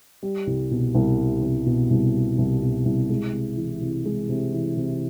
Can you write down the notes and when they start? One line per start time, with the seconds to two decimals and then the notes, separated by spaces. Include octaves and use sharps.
0.23 G3
0.47 C2
0.71 B2
0.95 C2
1.19 G3
1.42 C2
1.66 B2
1.90 C2
2.14 G3
2.38 C2
2.61 B2
2.85 C2
3.10 G#3
3.33 C3
3.57 E3
3.81 C3
4.06 G#3
4.29 C3
4.53 E3
4.77 C3